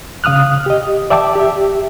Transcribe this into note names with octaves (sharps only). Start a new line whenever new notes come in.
C#3 F5 D#6 F6 F#6
G4 D#5
D5 E5 G5 A5 D6
G4 E5